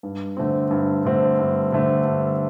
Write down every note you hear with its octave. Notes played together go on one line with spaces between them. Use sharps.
G2
D3 A3 C4
G2
D3 A3 C4
G2
D3 A3 C4
G2